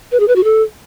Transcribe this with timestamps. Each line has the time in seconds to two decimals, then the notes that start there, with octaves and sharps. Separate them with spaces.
0.12 B4
0.20 G#4
0.28 B4
0.36 F#4
0.44 A4